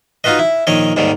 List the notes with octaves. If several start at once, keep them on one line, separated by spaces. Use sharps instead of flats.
D#4 F4 F#4 B4 D#5
E4
A#1 D#3 C#5 D#5
D#2 G#2 D#3 G3